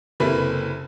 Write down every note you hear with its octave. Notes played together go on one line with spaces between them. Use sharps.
F#1 C3 A#3 E4 A4 B4